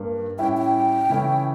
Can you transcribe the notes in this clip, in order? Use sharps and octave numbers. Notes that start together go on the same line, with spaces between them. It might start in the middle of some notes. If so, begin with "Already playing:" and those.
Already playing: G2 A#3
A2 G3 C#4 E4 G5
G5
C#3 E3 A3 C#4 E4